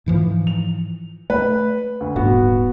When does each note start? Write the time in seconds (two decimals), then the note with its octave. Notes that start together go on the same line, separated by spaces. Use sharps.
0.06 G#2 E3 F3
0.47 F7
1.30 A3 B4
2.00 D2
2.16 D#1 G#2 B3 F#4